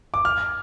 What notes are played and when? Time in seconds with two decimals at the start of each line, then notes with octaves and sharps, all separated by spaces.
0.14 D6
0.25 F6